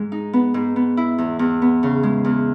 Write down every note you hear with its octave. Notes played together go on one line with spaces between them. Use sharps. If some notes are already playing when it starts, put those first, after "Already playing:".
Already playing: G#2 G#3
D#4
B3
G#2
B3
E4
E2
E2
B3
C#3
G#3
E2